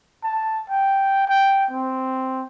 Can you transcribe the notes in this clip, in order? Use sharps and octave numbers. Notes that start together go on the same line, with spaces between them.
A5
G5
G5
C4